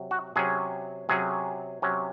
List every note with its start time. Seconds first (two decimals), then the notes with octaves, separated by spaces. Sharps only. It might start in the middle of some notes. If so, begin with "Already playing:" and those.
Already playing: C3 F#3
0.11 F#4
0.36 C3 F#3 C#4 G#4
1.09 C3 F#3 C#4 G#4
1.82 C3 F#3 C#4